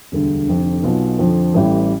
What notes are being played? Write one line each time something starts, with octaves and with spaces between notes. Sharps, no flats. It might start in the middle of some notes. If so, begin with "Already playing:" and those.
E1 D2 D3 G3
F1 F2 D3
B1 B2 B3 F4
F2 D3 F3
A1 A2 E3 G3